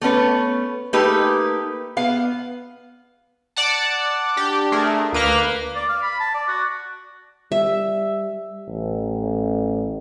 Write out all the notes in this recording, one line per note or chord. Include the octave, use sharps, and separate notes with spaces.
A3 B3 C#4 B4
A3 A#3 D#4 G4 B4
B3 F5
D5 F#5 A5
D4 G4
A3 G#4 A#4
D2 A#3 B4 F6
D5
F5
B5
A5
D5
F#4
G3 E5
A1